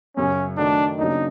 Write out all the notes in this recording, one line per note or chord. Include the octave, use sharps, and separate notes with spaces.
F#2 C#3 F#3 C#4
D#3 F#3 A3 D4
C#3 F#3 A#3 D4 D#4